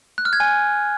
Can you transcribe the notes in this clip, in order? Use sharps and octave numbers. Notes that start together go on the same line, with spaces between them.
F#6
F6
G#6
G#5